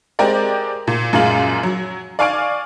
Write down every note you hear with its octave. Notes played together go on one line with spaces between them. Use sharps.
G#3 C4 G4 A#4 D5
A#2
F#2 A#2 G#3 F4 F5 F#7
F#3
D5 F5 G#5 C#6 F6 D7